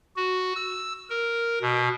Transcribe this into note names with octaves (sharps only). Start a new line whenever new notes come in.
F#4
E6
A#4
B2